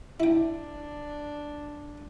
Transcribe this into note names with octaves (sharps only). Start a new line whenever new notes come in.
D4 E4 G5